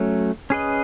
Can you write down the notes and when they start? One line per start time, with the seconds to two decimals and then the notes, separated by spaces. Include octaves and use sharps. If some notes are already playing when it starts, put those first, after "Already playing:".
Already playing: F#3 A3 C#4
0.50 C#4 G#4 B4 D#5